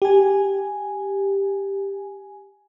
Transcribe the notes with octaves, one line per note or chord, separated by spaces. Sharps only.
G4 G#5